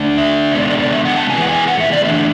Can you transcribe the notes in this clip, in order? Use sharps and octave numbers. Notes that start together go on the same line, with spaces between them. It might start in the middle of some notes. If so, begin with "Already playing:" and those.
Already playing: D3 A3 D4
E5
D3 G#3 B3 D5
D5
D5
E5
F#5
A5
E3 G#3 B3 G#5
F#5
G#5
F#5
E5
D5
E3 A3 D4 E5